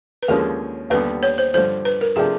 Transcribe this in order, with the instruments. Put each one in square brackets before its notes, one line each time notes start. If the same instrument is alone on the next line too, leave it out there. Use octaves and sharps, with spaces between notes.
[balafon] B4
[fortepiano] D#2 D3 F3 G#3 C#4 [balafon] A#4
[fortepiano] D#2 D3 G3 B3 [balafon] B4
[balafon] C#5
C5
[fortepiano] G2 D3 F3 [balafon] C5
[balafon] B4
A#4
[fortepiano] C3 F3 A3 D4 G4 [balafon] G#4